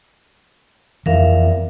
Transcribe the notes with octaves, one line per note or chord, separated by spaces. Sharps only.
F2 E3 A#4 E5 F5